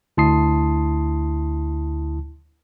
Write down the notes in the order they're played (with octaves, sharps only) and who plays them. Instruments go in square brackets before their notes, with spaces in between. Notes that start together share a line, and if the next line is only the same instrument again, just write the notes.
[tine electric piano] D2 E4 A5 C6 D#6 C7